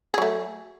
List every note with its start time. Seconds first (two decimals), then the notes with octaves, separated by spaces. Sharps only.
0.14 G#4
0.18 F#3
0.22 A3